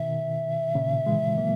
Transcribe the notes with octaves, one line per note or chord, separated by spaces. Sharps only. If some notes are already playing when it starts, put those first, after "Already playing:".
Already playing: B2 D#3 E5
A#2 C#3
E3 G#3
F#3 A#3